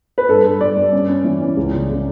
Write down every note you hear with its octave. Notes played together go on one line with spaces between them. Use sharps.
B4
G2 A4
G2
G2 D5
G2
C#4
C#4
E3
C#4
C#2
C#3
C#3